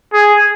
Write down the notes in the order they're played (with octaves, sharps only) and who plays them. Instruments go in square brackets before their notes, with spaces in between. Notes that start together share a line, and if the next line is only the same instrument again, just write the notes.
[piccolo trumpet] G#4